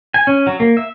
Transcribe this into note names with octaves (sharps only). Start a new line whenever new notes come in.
G#5
C#4
F#3
A#3
E5